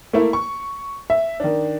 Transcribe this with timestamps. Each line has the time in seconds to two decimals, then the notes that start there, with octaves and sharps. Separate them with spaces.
0.13 A3 A#3 E4
0.33 C#6
1.10 E5
1.40 D#3 D4